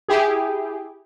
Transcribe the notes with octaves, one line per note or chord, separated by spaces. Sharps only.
E4 G4 G#4